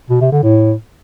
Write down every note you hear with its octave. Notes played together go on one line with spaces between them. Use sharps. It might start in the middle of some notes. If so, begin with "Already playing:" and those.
B2
C3
D3
A2